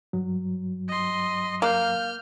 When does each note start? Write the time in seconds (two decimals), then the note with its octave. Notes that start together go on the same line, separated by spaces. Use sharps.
0.13 G2 F#3
0.89 D#5 C6
1.62 A#3 F6 G6